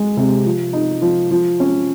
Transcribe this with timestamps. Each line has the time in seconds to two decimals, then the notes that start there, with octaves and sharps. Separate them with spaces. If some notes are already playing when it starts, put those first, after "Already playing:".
Already playing: G#3
0.17 C3
0.45 F3
0.73 D#4
1.02 F3
1.31 F3
1.60 C#4